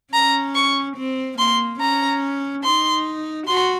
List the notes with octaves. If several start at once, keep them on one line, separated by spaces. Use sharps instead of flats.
C#4 A#5
C#6
C4
A#3 C6
C#4 A#5
D#4 C6
F#4 C6